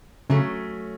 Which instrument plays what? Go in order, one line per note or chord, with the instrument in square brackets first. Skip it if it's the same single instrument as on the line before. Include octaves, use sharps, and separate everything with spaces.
[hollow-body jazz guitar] C#3 [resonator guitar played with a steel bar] F#3 A3 C#4